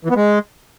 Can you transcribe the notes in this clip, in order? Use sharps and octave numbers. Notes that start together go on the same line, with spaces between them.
E3
B3
G#3